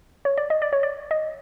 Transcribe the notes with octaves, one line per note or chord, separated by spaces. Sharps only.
C#5
D5
D#5
D5
C#5
D5
D#5